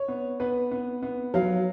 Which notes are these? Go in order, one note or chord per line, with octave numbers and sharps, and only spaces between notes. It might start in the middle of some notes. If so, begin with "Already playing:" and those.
Already playing: C#5
B3
B3 B4
B3
B3
F#3 F5